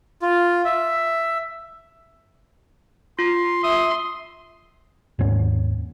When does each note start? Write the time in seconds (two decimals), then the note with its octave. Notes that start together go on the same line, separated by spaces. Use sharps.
0.22 F4
0.65 E5
3.19 F4 C6
3.64 E5 C6 D#6
5.19 D#2 G#2 C#4